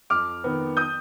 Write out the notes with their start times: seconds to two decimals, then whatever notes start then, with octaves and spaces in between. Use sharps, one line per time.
0.10 F2 D6 F6
0.44 D#3 B3
0.77 D#6 G6